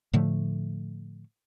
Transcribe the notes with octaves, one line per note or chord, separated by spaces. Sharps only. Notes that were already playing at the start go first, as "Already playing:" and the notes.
A2 D3 F3 A3